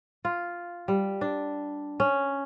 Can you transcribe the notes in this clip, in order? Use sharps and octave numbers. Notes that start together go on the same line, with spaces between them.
F4
G3
D4
C#4